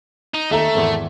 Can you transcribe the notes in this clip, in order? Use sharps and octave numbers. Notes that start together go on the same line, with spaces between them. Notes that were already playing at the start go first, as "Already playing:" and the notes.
D#4
D#2 A3 A4 E5 A#5
G#1 E2